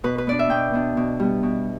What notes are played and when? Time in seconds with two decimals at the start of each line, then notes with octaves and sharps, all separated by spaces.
0.04 B2 B4
0.18 B4
0.27 B3 D4 D5
0.39 E5
0.50 B2 G5
0.73 B3 D4
0.97 B2
1.20 G3 B3
1.43 B2